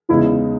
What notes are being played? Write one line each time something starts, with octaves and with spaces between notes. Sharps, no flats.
E2 C#3 G#3 D#4 E4